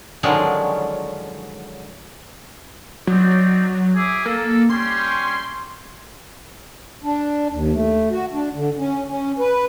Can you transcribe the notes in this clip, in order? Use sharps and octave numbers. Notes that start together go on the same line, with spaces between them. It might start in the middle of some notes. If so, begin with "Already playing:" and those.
D3 D#3 F3 F#3 G#3 C#4
F#3 C4 D#4 D5
G#4 E5 D6
A#3 A4
G3 C#4 G4 C6
D4
D#2
A3
F#4
D4
D3
C#4
C#4
B4